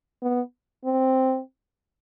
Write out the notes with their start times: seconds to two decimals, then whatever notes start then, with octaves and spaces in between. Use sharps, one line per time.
0.22 B3
0.85 C4